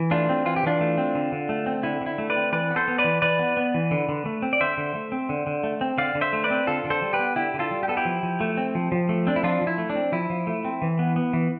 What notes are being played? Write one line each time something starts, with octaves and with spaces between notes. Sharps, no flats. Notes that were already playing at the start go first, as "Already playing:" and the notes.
Already playing: E3
A3 D4 F4
C4
E3 F4
G4
E3 D4 F4
A3
C4
D3
D3
A3
C4
D3 E4
D3
E4
A3
B4 D5
C4
E3 B4 D5
B3
A4 C5
B3
B4 D5
E3
E3 B4 D5
B3
B3
E3
D3
D3
A3
C4
D5
D3 C5 E5
D3
A3
C4
D3
D3
A3
C4
D3 D5 F5
D3
C5 E5
A3
B4 D5
C4
D3 F4 A4
D3
A4 C5
G3
G4 B4
B3
D3 E4 G4
D3
F4 A4
G3
G4
B3 A4
E4 G4
F3
F3
A3
C4
F3
F3
A3
C4 D4
E4
F3 D4 F4
F3
E4
A3
D4
C4
F3 E4
F3
A3
C4
E3
B3
B3
E3